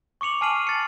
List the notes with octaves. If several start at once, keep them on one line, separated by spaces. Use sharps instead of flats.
C#6 D6 C#7 F7 F#7
G#5 A5 F6 C7 D#7 F#7
A6 C#7